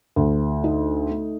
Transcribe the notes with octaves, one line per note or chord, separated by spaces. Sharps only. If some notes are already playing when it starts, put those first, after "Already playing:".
D2
D#4
A3